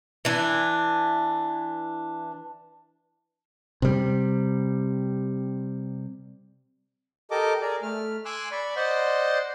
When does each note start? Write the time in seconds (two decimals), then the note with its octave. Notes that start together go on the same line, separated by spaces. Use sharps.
0.25 E3 D4
3.82 C3 G3
7.31 G4 A4 A#4 D#5 D6
7.61 G#4 A#4 D5
7.82 A3 F6
8.25 G#5 C6 D6 E6 F#6
8.52 D5 B5 C#6
8.76 C5 D5 D#5 F#5 C6